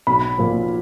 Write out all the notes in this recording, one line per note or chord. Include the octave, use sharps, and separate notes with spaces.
B1 B5
A#2 F3